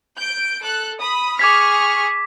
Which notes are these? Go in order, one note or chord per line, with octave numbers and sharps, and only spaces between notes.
G6 D7
A4 F#6
B5 D#6
G#4 C#6 D6 F6 G#6 B6